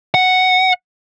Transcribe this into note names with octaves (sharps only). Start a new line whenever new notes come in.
F#5